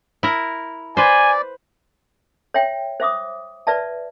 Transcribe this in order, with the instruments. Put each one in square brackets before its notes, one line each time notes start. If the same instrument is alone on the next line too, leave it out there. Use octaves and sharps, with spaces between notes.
[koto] E4 A#4
[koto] B4 C5 [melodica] D5 [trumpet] G#5
[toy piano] C#5 E5 G5
C5 E5 D6 D#6
B4 D5 E5 A5